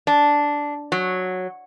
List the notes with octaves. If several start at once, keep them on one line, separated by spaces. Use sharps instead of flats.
D4
F#3